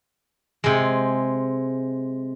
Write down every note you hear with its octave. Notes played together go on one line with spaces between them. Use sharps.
C3 G#3